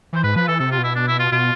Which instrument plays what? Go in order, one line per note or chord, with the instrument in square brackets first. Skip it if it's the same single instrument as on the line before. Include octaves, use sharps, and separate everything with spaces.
[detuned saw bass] E3 [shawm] C5
[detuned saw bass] G#2 [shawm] B4
[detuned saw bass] F3 [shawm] B4
[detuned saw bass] E3 [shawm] A4
[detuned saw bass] C3 [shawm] A4
[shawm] F4
[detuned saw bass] B2
[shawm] E4
D4
E4
F4
[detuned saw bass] B2 [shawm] F4